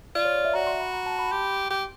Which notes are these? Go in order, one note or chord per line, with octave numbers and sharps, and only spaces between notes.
F4 D5
C#5
D5
E5
F#4 A#5
C6
B5
A#5
A5
B5
G4 C6
G4